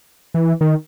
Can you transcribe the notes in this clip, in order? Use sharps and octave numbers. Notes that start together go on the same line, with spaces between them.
E3
D#3